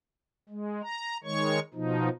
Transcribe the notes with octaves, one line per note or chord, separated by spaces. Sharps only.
G#3
A#5
D#3 G#3 C#5 C#6
B2 F3 D#4